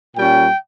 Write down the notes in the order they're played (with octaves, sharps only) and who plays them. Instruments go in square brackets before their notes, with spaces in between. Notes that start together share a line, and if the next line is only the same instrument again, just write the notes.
[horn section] A#2 G3 C#4 G5